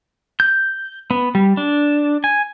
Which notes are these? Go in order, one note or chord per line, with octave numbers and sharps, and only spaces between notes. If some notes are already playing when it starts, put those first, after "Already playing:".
G6
B3
G3
D4
G#5